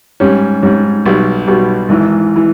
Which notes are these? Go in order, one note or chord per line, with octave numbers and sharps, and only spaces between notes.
G#2 G3 C#4
G#2 G3 C#4
B1 B2 G3
B1 B2 G3
G#1 G#2 E3
E3